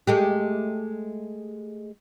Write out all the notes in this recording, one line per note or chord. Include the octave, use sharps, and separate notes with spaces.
G#3 A3 G4